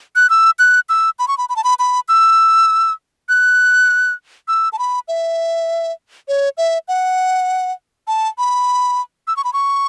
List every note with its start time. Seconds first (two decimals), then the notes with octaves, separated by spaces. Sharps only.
0.16 F#6
0.30 E6
0.59 F#6
0.89 E6
1.19 B5
1.28 C#6
1.38 B5
1.49 B5
1.56 A5
1.64 B5
1.79 B5
2.09 E6
3.29 F#6
4.48 E6
4.73 A5
4.79 B5
5.08 E5
6.28 C#5
6.57 E5
6.88 F#5
8.07 A5
8.38 B5
9.27 E6
9.37 C#6
9.44 B5
9.53 C#6